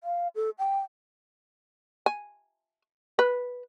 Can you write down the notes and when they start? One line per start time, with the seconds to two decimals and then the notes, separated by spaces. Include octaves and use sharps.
0.04 F5
0.35 A4
0.59 G5
2.06 G#5
3.19 B4